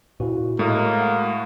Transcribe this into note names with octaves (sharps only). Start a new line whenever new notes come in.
A#2 E4 F#4
A2 G#3 A#3
F5 F#5 C#6